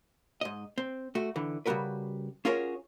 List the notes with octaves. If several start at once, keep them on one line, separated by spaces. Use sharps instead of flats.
G#2 D#5
C4
A3 F#4
D3 E3
C#3 G3 D#4 F#4 A#4 B4
C#4 F4 F#4 G#4 A#4 C#5